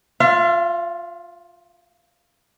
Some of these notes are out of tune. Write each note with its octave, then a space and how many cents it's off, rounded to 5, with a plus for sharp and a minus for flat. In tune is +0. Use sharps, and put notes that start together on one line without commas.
F4 +15 F5 -45